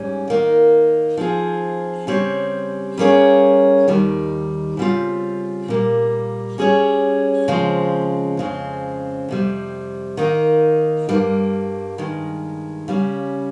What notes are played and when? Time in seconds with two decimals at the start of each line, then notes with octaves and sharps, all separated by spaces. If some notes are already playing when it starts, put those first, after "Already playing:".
Already playing: G#2 G3 C#4
0.28 D#3 A#3 D#4
1.17 F3 C4 F4 G#4
2.07 C#3 G3 C4 G4 C#5
2.97 G3 A#3 C#4 G#4 C#5
3.88 D#2 D#3 G3
4.77 C#3 G3 C4 F4
5.68 A#2 G3 A#3
6.58 G3 C#4 G#4 C#5
7.48 C#3 F3 G#3 C4
8.37 F2 C#3 G#3 C4
9.29 F2 C3 G3
10.17 D#3 A#3 D#4
11.09 G2 G3 A#3
11.98 G2 D#3 G#3
12.88 C#3 G3 C#4